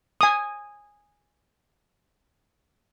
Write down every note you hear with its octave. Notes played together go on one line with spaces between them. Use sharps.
G#5 D#6